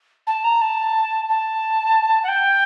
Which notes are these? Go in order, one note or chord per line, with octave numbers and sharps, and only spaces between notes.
A5
A#5
A5
A5
F#5
G5